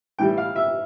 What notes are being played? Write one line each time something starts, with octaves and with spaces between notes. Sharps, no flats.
A2 E3 G3 G5
F5
E5